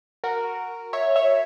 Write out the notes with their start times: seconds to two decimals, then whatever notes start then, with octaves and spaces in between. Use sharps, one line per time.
0.24 F#4 A#4
0.93 C#5 E5
1.16 C#5 E5